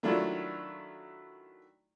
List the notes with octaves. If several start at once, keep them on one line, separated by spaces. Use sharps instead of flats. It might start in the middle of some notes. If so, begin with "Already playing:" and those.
D#3 F#3 A3 D4 E4 F4